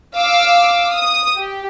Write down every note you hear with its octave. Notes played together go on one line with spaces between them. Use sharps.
F5 D6 E6
D#6
G4